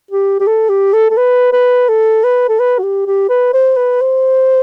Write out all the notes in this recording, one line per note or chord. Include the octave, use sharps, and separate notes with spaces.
G4
G4
A4
G4
A4
A4
B4
B4
A4
B4
A4
B4
F#4
G4
G4
B4
C5
B4
C5